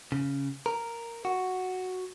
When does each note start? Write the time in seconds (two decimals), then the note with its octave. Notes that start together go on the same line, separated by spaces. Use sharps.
0.12 C#3
0.66 A#4
1.25 F#4